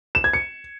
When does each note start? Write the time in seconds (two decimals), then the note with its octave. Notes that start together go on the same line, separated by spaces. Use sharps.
0.15 E7
0.24 G#6
0.33 C#7